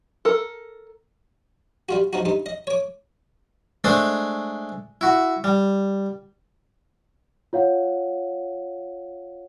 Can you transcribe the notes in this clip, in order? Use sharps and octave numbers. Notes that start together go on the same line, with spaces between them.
A4 A#4
G3 F4 F#4
F3 D#4 F#4
G2 D#4
D#5
C#5 D6
G#3 A3 D4 C5 G#5
E4 F#4
G3
F4 C#5 F5 F#5